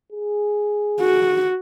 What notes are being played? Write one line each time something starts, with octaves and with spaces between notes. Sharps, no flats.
G#4
F#4